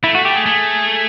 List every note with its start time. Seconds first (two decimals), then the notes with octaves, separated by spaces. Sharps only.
0.03 A3 E4
0.15 F#4
0.25 G4
0.36 G#4
0.46 A3